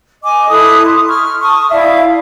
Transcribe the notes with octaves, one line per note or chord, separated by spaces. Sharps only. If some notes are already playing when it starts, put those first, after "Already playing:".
D#5 G#5 D6
E4 A4 D#6 F#6
C6
C#6 F6
A5 C#6 D#6
E4 D5 E5 F5